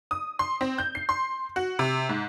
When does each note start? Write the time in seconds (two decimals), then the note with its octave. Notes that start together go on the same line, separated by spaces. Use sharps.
0.11 D#6
0.39 C6
0.61 C4
0.78 G6
0.95 C7
1.09 C6
1.56 F#4
1.79 C3
2.09 G#2